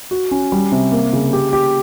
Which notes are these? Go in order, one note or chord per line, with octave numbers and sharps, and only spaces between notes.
F#4
C#4
G3
C3
A#3
C#3
G4
G4